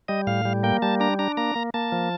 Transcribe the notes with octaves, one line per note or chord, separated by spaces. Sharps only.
G3 D#5
A2 F5
G3
A#3 G5
G3 A5
D4 A#5
D4 A#5
A#3 A#5
A#3
A#3 A5
F3